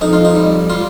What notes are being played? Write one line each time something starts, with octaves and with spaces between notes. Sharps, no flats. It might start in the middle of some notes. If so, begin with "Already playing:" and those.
F2 D#4
F4
D#4
G3
G3 F4